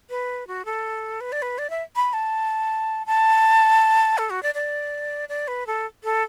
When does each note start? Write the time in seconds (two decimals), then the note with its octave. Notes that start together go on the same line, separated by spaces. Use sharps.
0.10 B4
0.47 F#4
0.65 A4
1.21 B4
1.32 D5
1.42 B4
1.58 D5
1.70 E5
1.96 B5
2.13 A5
3.06 A5
4.18 A4
4.30 F#4
4.43 D5
4.55 D5
5.29 D5
5.48 B4
5.67 A4
6.04 A4